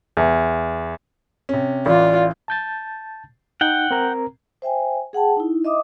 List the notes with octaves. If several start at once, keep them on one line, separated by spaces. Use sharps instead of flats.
E2
C3 C#4
A1 E3 F4 D5
A5 G6 A6
D#4 F#5 G5
C4 A#4 A#5
C5 E5 G5 G#5
G#4 F#5 G5 A5
D#4 E4
D#5 E5 D6 D#6